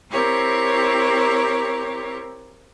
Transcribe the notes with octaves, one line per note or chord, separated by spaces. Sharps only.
C4 E4 G4 A#4 C#5